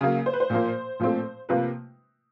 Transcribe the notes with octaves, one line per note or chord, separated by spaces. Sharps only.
C#3 F#3 A#3
C5
B4
C5
A#2 F3 A#3
A#2 F3 A3 C4
C3 F3 A#3 B4